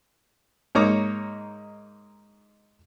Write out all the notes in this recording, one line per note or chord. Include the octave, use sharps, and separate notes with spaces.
G#2 A#3 D#4 C#5 A#5 D6